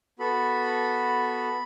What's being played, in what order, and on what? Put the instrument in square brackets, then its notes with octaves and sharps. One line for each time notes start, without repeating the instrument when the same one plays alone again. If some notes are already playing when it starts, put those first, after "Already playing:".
[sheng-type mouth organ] B3 F#4 A4 B5